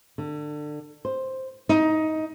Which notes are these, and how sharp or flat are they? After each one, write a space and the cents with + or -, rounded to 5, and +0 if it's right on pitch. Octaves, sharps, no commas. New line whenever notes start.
D3 +25
C5 +5
D#4 +15